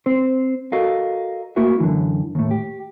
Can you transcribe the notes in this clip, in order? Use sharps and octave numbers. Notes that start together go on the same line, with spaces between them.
C4 C5
F#4 A4 A#4 D#5 F5
A3 A#3 E4 F#4 A#4 E5
F#2 D3 E3
D#2 A2
G4